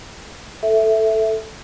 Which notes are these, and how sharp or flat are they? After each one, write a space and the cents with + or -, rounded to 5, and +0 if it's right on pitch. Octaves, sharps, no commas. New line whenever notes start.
A4 +0 E5 +0